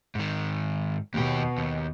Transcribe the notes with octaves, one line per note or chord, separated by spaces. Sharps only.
G#2 D#3
D#2 B2 G4
D#2